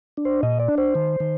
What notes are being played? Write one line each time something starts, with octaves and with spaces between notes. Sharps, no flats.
D4
C5
A#2 D#5
D5
D4
C5
D#3
D#3